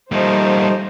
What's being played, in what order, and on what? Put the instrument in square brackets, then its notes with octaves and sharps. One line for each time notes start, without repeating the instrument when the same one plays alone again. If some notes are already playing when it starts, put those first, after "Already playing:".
[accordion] F3 A3 D#4 [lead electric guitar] G3 A#3 [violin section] C5